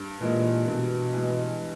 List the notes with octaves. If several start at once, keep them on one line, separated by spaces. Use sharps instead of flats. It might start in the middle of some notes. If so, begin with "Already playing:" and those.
Already playing: G2
A#2 E3 G#3
G2 B2
E3 G#3